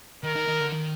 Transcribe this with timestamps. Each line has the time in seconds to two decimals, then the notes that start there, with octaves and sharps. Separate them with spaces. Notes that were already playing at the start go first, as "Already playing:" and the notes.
0.23 D#3 A#4
0.35 D#3
0.48 D#3
0.60 D3
0.72 D#3